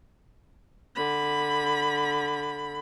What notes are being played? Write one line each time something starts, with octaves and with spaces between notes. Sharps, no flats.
D3 B5